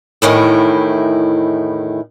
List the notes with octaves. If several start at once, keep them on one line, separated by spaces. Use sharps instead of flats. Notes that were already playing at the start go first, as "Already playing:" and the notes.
E2 A2 D#3 E4